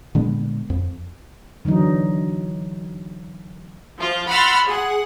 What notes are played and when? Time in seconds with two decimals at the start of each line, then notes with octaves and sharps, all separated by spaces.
0.15 A#2 D3 G#3 B3
0.70 F2
1.65 D3 E3 F#3 D#4
3.99 F3 F4
4.28 F#5 B5 C6 E6 F6 A6
4.66 G#4 F#5